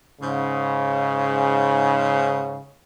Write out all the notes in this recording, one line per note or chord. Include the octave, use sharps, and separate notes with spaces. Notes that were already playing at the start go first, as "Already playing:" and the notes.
G#2 C#3